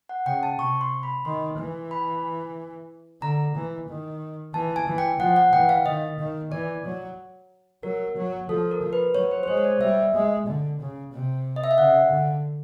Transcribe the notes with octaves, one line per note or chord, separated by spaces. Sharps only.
F#5
C#3 G5
A5
C3 C#6
C6
B5
D#3 C6
E3
B5
D3 A#5
E3
D#3
E3 A5
G#5
E3
G5
F3 F#5
F#5
E3 G5
F5
D#3 D#5
D#3
E3 D5
F#3
F#3 A#4
F#3
F3 A4
A#4
F3
B4
F#3 C#5
C5
C5
G#3 C#5
C#5
D5
G3 E5
G#3
D3
C#3
C3
D#5
E5
F5
C#3 F#5
D3